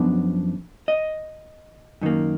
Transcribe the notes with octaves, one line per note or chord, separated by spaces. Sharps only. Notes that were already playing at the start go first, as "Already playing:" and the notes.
Already playing: F#2 F3 B3 D4
D#5
F#2 D#3 A#3